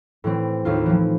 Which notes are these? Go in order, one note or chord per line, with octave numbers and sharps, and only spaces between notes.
A2 E3 C4
D#2 A2 F4
E3 F3